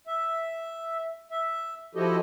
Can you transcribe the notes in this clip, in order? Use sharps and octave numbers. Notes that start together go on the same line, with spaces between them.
E5
E5
F3 E4 F#4 G4 A4 D#5